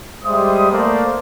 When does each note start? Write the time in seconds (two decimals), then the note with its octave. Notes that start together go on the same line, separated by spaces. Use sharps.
0.24 G3 G#3 C5 E5 D#6
0.70 A3 A#3 A#4 C5 D5 F5